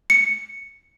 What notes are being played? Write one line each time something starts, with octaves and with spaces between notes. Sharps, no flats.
C#7